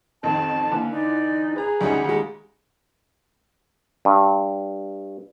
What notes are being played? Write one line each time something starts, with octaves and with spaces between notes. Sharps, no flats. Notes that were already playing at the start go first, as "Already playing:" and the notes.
A1 F2 D#3 A5
D3 E3 A#3
D#4 D5
G#4 B4 A#5
D2 G3 C#4 D#4 F#5
D#2 G#3
G2